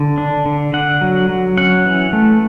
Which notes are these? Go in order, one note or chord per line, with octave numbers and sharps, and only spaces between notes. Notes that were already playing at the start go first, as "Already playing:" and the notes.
Already playing: D3
D4
D3
D3 F#5
F#3
F#3
C#4 F#5
E3
A3